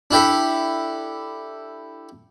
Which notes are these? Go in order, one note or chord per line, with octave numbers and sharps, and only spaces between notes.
D4 E4 G4 A4